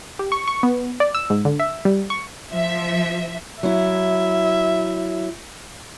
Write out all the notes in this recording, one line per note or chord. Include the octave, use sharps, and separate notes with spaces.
G4
C#6
C#6
B3
D5
E6
G#2
D3
E5
G3
C#6
F3 E5
F#3 E4 E5